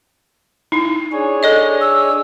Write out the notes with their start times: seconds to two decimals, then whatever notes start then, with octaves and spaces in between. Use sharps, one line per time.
0.72 D#4 E4
1.12 D4 G#4 C#5
1.43 A4 D5 D#5
1.81 E6